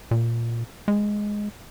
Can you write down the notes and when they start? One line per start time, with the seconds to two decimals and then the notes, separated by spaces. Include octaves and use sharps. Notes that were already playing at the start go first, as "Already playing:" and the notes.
0.11 A#2
0.88 G#3